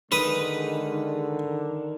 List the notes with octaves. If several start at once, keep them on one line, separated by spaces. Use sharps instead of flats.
D3 D#3 G#3 B4 D#6